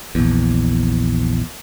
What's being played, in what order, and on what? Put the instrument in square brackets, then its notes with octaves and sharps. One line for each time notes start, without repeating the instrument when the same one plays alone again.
[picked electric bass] A#1 E2